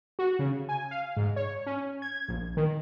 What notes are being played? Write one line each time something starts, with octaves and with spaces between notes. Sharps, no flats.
F#4
C#3
G#5
F5
G#2
C#5
C#4
G#6
A#1
D#3